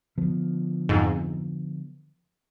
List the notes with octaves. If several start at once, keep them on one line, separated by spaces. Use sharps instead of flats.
D3 F3 B3
F2 G#2